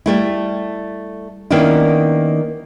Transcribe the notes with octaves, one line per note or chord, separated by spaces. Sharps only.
G3 A3 E4
D#3 A#3 B3 C#4 D4 E4